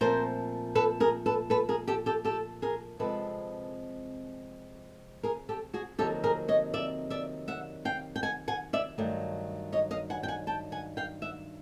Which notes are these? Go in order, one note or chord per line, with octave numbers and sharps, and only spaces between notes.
A#2 F3 A3 C4 A#4 C5
A4 B4
G#4 A#4
A4 B4
A4 B4
G#4 A#4
G4 A4
G4 A4
G4 A4
G#4 A#4
C3 F3 G#3 C4 A4 B4
G#4 A#4
G4 A4
F#4 G#4
F2 C3 D#3 F#3 A#3 G4 A4
G#4 A#4
C#5 D#5
D5 E5
D5 E5
E5 F#5
F5 G5
G5
F#5 G#5
F#5 G#5
D5 E5
G2 D#3 F#3 A3
C#5 D#5
D#5 F5
F#5 G#5
G5
F#5 G#5
G5 A5
F#5 G#5
F5 G5
E5 F#5